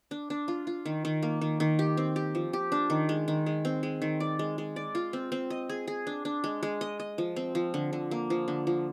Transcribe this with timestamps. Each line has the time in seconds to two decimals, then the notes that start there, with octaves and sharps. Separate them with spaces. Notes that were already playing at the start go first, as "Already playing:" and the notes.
0.11 D4
0.30 D4
0.48 F4
0.67 F4
0.86 D#3
1.05 D#3
1.23 A#3
1.41 D#3
1.60 D#3
1.79 G4
1.97 C4
2.16 G4
2.35 F3
2.53 G4
2.72 D4
2.90 D#3
3.09 G#3
3.28 D#3
3.46 G#3
3.65 C4
3.83 G#3
4.02 D#3
4.20 D5
4.39 G#3
4.58 G#3
4.76 D5
4.95 F4
5.13 C4
5.32 C4
5.50 D#5
5.69 G#4
5.88 G#4
6.07 D4
6.25 D4
6.44 G#3
6.63 G#3
6.81 D#5
7.00 D#5
7.18 F3
7.36 C4
7.55 F3
7.74 D3
7.93 D3
8.11 A#3
8.30 F3
8.48 D3
8.67 F3